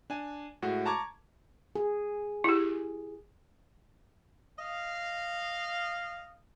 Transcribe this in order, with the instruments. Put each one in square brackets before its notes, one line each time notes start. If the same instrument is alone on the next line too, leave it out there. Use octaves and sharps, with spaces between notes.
[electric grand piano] D4 G#5
A2 G#3 F#4
A5 A#5 C#6 D6 G#6
[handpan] G#4
[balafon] E4 G4
[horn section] D#5 F5